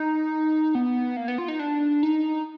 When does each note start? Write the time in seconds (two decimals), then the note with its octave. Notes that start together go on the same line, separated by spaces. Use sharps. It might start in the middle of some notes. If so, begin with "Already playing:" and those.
Already playing: D#4
0.75 B3
1.17 A#3
1.28 B3
1.38 F4
1.48 D#4
1.59 D4
2.03 D#4